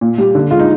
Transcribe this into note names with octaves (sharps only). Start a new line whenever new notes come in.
A#2
G3
D3
G#3 F4
D#4